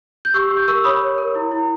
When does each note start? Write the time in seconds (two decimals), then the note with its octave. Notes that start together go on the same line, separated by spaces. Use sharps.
0.25 G6
0.34 G4 C#6 E6
0.51 G4
0.57 G6
0.68 A#4 C#6 E6
0.84 C#5 B5 D#6
1.02 C#5
1.18 A#4
1.35 E4
1.52 E4